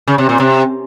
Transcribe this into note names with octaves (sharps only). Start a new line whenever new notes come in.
C#3
C3
A#2
C3